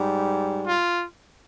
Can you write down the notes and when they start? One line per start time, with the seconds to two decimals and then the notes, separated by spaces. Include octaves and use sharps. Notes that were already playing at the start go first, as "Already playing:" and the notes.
Already playing: G#2 G3
0.68 F4